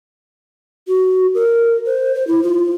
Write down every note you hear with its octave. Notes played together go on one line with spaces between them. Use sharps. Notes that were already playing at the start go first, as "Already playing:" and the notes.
F#4
A#4
C5
C5
E4
F4